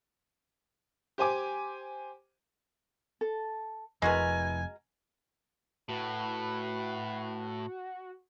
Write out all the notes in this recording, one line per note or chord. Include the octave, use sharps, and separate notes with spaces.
G4 C5 G#5 D6
A4
F1 F2 G#3 E4 F#4 A#4 B4 G#5
A2 F#4 B4